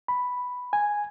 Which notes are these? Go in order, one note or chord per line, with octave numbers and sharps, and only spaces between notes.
B5
G#5